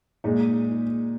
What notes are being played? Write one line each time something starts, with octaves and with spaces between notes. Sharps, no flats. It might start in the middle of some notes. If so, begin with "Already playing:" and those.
A#2 G#3 D#4